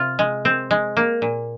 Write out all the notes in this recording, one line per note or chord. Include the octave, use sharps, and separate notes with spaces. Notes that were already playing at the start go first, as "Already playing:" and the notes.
Already playing: C3 F4
G#3
C4
G#3
A#3
A#2